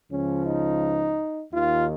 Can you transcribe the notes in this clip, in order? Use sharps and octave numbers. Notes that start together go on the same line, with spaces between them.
C#2 C#3 F3 C#4
D#4
D#2 D#3 F4